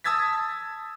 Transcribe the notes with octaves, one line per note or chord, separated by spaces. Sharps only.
A5 D#6 E6 G#6 A6 B6